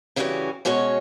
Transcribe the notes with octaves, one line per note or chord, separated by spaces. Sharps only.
C#3 E3 G3 C#4 F4 F#4
B2 G#3 C#4 F#4 C#5